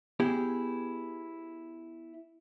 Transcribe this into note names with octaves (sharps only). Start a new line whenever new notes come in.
B3 E4 G4 G#4